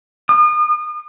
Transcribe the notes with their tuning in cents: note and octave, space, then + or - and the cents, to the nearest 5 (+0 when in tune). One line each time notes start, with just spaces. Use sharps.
D#6 -35